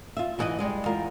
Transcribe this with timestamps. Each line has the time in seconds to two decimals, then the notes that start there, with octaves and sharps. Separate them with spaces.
0.17 F4 E5
0.38 G#2 E3 F4 G4 B4 D#5
0.59 G3 G#3 D#5
0.86 E2 F4 A#4